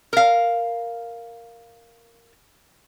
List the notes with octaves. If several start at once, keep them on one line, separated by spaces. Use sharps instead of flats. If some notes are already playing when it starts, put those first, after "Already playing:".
A#4 F5